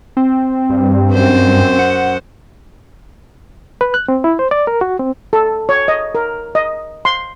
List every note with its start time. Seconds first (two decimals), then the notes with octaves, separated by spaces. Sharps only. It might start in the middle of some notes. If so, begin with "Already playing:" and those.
0.17 C4
0.70 G2
1.11 F#2 C5
1.79 F#5
3.81 B4
3.94 F#6
4.08 C4
4.24 E4
4.39 C5
4.51 D5
4.67 A#4
4.81 F#4
4.99 C4
5.33 A4
5.69 C#5
5.88 D#5
6.15 A#4
6.55 D#5
7.05 C6